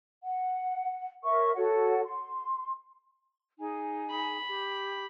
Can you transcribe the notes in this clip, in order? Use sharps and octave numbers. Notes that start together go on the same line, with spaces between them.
F#5
A#4 C#5 E5 C#6
F#4 A4 C#5 F#5
C6
D#4 G#4 G#5
B5
G4